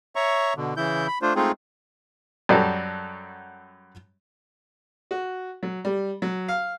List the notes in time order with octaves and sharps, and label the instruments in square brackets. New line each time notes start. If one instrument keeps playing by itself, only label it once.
[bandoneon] C#5 E5 A#5 C#6
B2 D3
C#3 E3 E4 G6
B5
A3 D4 F4 C5
G#3 A3 C4 D#4 F4 G#4
[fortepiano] F#2 G3 F#4 A4 A5
F#4
F#3
G3
F#3
F5